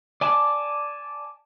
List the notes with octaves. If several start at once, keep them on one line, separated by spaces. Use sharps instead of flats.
D5 G#5 A5 D6